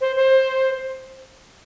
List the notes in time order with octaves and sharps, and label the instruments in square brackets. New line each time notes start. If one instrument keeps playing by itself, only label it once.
[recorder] C5
C5